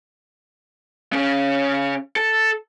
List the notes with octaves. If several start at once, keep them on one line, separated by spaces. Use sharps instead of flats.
C#3 C#4
A4